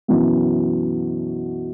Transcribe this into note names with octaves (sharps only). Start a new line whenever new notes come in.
F#2 B2 E3 F#3